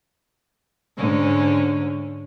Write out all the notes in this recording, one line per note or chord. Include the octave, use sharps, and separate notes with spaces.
G#2 D3 C#4